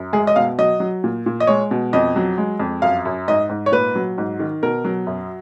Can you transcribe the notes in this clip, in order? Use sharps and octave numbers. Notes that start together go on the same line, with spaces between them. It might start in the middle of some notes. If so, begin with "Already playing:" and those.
Already playing: F#2
G#3 G#4
D#5
B2 F5
F#3 D#5
F#3
A#2
A#2
D#5
G#3 C#5
B2
F2 D#5
F#3
G#3
F2
F#2 F5
F#2
G#2 D#5
G#2
C#5
A#2 B4
F#3
G#2
D#3
B2 A#4
F#3
F#2